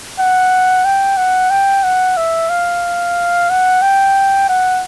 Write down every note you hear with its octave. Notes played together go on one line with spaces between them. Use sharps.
F#5
G5
F#5
G5
F#5
E5
F5
F#5
G5
F#5